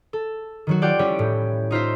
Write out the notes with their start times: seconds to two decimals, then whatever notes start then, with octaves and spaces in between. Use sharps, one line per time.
0.13 A4
0.67 D#3 F#3 F#4
0.82 F4 G4 D5 F#5 G5
0.99 G3 C#4 E4 C#5
1.19 A2
1.71 D#4 F4 C5 E5